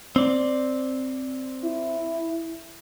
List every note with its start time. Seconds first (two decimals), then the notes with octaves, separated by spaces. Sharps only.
0.16 C4 D5
1.65 E4